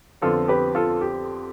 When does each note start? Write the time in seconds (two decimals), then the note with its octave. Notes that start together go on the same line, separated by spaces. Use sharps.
0.22 F2 D3 F3 B3 F4 A4
0.48 G4 B4
0.75 F4 A4
1.01 G4